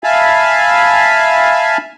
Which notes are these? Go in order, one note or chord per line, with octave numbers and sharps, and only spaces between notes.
E5 F5 G#5 A5 B5